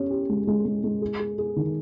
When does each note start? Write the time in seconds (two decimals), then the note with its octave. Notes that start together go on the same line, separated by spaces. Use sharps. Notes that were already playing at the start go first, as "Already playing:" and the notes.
Already playing: C#4 G4
0.11 G4
0.29 G#3
0.47 G#3
0.65 G#3
0.84 G#3
1.02 G#4
1.20 G#4
1.38 G#4
1.56 D#3